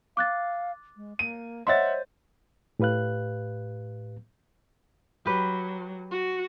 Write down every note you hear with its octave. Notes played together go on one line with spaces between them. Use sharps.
F5 D6 F#6 A6
G#3
A#3 D#7
C5 C#5 D#5 E5 F#5 C6 A6
A2 G4 B4 F5 F#6
F#3 G4 B4
F#4